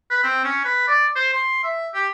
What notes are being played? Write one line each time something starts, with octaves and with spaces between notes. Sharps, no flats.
B4
C4
C#4
B4
D5
C5
C6
E5
G4